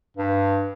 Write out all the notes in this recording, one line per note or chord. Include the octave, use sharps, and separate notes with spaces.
G2